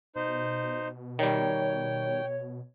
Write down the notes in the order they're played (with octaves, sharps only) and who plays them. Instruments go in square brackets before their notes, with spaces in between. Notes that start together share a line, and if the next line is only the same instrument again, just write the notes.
[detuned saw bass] B2 [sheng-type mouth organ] D#4 C5
[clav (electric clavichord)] D#3 G3 [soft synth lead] C#5 [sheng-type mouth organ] G5